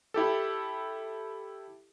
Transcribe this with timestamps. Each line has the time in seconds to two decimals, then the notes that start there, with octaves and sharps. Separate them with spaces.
0.14 E4 G4 A4